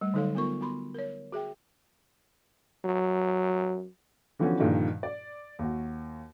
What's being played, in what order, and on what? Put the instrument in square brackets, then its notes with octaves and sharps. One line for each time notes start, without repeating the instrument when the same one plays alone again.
[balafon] G3 A3
D3 F#3 D#4 A4 C#5 F5
B3 F4 A#4 C#6
B3 F#4 B5 C6
A#4 C#5
F#4 G#4 E5 G5
[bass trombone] F#3
[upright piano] D3 E3 F3 B3 C#4 F#4
G2 A#2 D3 D#3 F3
D5
D#2 F#4